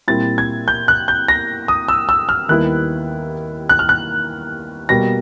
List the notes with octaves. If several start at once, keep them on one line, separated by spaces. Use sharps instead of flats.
A#2 G3 C4 E4 A6
G#6
G6
F#6
G6
A#6
D#6
E6
E6
F6
D#2 D#3 G3 B3 E4 F#6
F#6
F6
F#6
B2 G3 A#3 A#6